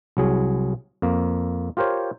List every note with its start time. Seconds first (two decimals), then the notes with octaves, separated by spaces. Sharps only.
0.17 C2 F#3 G#4
1.02 F2 A#3
1.77 F4 G4 A#4 C5 C#5